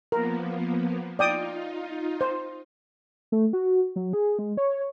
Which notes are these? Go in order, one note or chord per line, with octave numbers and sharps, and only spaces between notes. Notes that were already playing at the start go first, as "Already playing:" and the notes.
F3 A#3 B3 A#4
D#4 F4 D5 G5 D#6
C5
A3
F#4
F#3
G#4
G#3
C#5